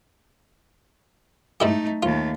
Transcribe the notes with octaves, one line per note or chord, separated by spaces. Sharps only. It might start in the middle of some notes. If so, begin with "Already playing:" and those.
G#2 A3 D#4 E4 G4
D#2 A3 F4